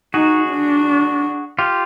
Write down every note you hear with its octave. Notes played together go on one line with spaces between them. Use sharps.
D#4 F#4 G#4
D4
F4 G4